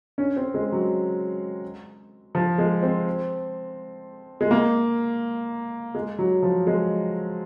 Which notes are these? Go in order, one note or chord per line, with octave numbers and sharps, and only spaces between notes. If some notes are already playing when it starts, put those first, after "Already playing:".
C#4
C4
G#3
F#3
F3
G#3
C4
G#3
A#3
G#3
F#3
F3
G#3